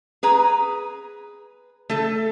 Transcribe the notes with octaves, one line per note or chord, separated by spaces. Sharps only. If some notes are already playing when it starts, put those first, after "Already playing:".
G#4 B4 A#5
A3 A4